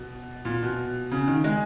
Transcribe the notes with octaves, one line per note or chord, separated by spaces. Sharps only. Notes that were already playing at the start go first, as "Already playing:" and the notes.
Already playing: B2
A#2
B2
C#3
D#3
G#3